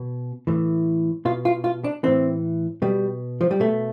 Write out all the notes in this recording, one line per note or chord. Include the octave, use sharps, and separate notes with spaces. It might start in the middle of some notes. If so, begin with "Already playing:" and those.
Already playing: B2
A2 E3
B2 F4
F4
F4
D4
A2 E3 C4
B2 G3
F3
G3
B2 A3